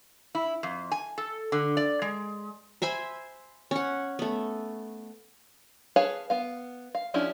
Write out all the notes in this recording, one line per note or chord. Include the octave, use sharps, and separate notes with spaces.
E4
F2
G#5
A4
D3
D5
G#3
C5 E5 G#5 B5
C#4 F#5
A3 B3
G#4 B4 C#5 F5 A5
B3 F5
F5
F3 C#4 D4 E4 G4